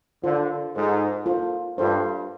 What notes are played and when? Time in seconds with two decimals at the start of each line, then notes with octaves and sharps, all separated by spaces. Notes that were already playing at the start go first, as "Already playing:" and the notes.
0.23 D3 F4 A4 C5
0.75 G#2 F4 A4 C5
1.26 F4 A4 C5
1.78 G2 F4 A4 C5